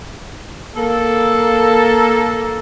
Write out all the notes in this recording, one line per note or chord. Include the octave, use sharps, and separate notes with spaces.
A#3 A4